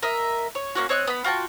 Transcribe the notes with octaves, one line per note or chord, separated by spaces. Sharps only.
A#4 D#5 E5
C#5
A#3 C#4 F#4
C4 C#5 D#5 F#6
B3 B5
F4 F#4 G5 A5